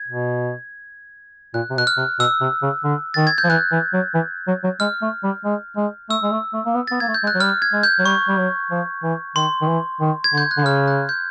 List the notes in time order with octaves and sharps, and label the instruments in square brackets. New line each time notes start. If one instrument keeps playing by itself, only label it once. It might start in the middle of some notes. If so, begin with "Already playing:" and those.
Already playing: [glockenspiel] G#6
[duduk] B2
[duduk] A#2 [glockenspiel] F#6
[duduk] C3
[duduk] B2 [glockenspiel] F#6
[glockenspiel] F6
[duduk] C3
[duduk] B2 [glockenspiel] E6
[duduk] C3
C#3
D3
[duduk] D#3 [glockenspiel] A6
[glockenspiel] G#6
G6
[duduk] F3
[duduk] E3 [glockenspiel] F#6
[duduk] E3
F#3
E3
F#3
F#3
[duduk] G#3 [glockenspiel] F6
[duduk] A3
G3
G#3
G#3
[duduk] A3 [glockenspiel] E6
[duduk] G#3
A3
A3
A#3
B3
[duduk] B3 [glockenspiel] A6
[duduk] A#3 [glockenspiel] G#6
[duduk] A3
[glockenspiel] G6
[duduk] G#3
[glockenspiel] F#6
[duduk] F#3
[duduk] G3 [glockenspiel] F6
[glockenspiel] G#6
[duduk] G#3
[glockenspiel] G6
[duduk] F#3
[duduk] G3 [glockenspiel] C#6
[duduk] G3
F#3
F3
E3
[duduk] D#3 [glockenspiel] C6
[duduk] D#3
E3
D#3
[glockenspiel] G#6
[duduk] D3 [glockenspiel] G6
[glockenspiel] F#6
[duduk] D3
[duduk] C#3 [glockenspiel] F6
[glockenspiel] F#6
G6